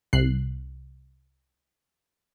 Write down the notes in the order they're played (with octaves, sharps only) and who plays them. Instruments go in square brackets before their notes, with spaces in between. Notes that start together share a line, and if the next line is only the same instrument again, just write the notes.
[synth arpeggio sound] C2 F#6 C7